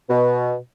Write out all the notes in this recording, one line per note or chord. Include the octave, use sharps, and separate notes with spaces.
B2